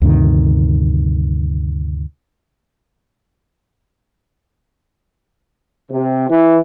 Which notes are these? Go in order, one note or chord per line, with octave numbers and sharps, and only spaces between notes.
D2 G2 C3 D#3
C3
E3